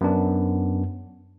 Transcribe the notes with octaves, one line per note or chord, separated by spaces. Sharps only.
F#2 B3 D4